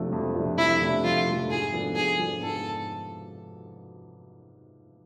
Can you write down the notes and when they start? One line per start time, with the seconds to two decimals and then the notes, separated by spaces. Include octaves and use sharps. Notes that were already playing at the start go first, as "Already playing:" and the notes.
Already playing: F2 C3 F3 A3 D4
0.12 F2
0.35 C3 F3 A3 D4
0.58 F2 E4
0.80 C3 F3 A3 D4
1.04 F2 F4
1.27 C3 F3 A3 D4
1.49 G#2 G#4
1.73 F3 B3 D4 A4
1.95 G#2 G#4
2.19 F3 B3 D4 A4
2.42 G#2 A4